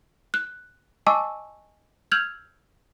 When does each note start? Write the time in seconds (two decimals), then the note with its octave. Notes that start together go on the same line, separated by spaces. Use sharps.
0.34 F#6
1.07 D#5 G#5 A5 C#6 D6 E6
2.12 E6 F6 G6 G#6 F7 F#7